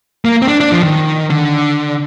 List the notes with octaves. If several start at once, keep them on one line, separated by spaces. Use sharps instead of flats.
A#3
C4
D4
D4
F3
D#3
D3